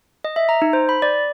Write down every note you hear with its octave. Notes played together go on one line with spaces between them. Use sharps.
D#5
E5
A#5
D#4
C5
B5
D5